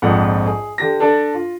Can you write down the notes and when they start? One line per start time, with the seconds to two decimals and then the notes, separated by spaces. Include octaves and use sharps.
0.02 A#1 F2 G#2 F#5
0.46 G#4
0.78 D3 G4 A#6
1.00 D4 A4 D5
1.34 F4